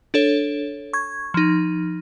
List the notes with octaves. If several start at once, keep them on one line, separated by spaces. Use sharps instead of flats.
D4 A4 C#5
C#6 G#6
F3 D#4